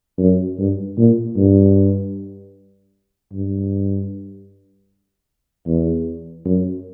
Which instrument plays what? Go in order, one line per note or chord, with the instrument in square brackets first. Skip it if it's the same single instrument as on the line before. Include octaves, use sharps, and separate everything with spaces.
[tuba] F#2
G2
A#2
G2
G2
E2
F#2